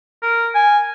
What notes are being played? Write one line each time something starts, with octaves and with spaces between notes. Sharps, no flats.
A#4
G#5